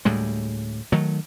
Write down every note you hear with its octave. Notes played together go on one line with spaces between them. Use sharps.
D2 A2 G3 G#3
D#3 F#3 A3